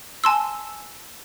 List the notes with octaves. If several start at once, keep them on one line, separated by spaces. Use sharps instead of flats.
G#5 A5 C6 E6